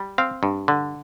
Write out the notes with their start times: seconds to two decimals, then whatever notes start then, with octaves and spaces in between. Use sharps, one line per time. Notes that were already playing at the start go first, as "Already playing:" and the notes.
Already playing: G3
0.18 C4 F5
0.43 G2
0.68 D3